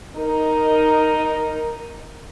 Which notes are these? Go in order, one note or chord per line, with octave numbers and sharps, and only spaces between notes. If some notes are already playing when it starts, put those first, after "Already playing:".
D#4 A#4